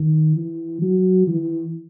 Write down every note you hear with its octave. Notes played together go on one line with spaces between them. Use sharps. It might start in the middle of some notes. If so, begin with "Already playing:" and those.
Already playing: D#3
E3
F#3
E3